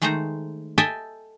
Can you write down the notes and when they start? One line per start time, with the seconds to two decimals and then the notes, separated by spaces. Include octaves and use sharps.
0.02 D#3 G#3 A3 D#4 C5 A#5
0.78 A4 D#5 E5 G5 G#5